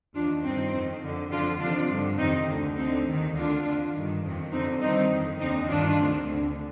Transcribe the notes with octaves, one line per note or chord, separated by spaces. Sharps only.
D#2 D#3 D4 F4
G2 D#3 C4 D#4
F2 D#3
F2 D3
F2 D3 D4 F4
F2 C3 D#3 D4 F4
G2 D3
F2 C3 D#3 C4 D#4
D2 D3
D2 D3 C4 D#4
D#2 D#3
D2 D3 D4 F4
F2 D3
G2 D#3
F2 C3 D#3
F2 D3 C4 D#4
G2 D#3 C4 D#4
F2 D#3
D#2 D3 C4 D#4
G2 D#3 D4 F4
D2 C3 D#3
D2 D3